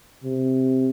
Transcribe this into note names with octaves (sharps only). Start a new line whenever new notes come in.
C3